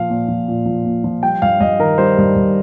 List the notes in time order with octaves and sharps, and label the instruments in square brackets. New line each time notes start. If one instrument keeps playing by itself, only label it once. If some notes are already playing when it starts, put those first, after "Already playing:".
Already playing: [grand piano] A#2 F3 F5
A#2
F3
A#2
F3
A#2
F3
G3 G5
G2 F5
G2 D#5
D#3 A#4
G3 C5
G2
G2